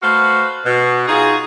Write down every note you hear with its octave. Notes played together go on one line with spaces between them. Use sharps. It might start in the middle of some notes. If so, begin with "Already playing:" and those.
A3 F#4 B4 C5 F5
B2
D#4 F4 F#4 G#4